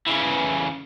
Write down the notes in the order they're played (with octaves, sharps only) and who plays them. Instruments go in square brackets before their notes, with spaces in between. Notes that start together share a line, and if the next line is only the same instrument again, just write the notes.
[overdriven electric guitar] C#3 E3